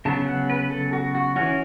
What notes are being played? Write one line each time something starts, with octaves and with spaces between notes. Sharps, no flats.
C#3 F#3 B3 A5
F#5
B4
A4
F#4
F#4
E3 C#4 F#4